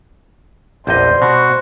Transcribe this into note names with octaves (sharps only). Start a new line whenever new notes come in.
A#1 E2 G3 C5 D#5 G5
B2 F#4